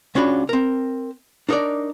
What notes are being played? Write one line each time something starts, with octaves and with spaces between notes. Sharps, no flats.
C#2 C#4 D4 F4 F#4 B5
C4 A#4
D4 D#4 A#4 C#5 D5